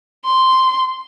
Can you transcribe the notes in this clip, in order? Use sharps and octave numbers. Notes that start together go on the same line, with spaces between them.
C6